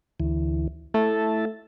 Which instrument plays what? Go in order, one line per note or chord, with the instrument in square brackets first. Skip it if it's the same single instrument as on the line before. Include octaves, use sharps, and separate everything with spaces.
[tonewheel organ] D2 E3
[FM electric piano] A3 [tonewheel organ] E4 E5 A5